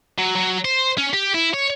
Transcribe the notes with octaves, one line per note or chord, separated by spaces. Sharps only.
F#3
F#3
C5
C#4
G4
E4
C#5